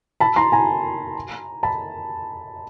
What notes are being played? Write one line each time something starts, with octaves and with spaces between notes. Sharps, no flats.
A5 B5
A#5 C6
G#5 A#5
A5 B5